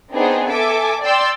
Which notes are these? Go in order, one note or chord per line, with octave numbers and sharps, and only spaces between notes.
B3 C4 D4 D#4 G#4
A4 E5 G#5 D6
D5 G5 C6 E6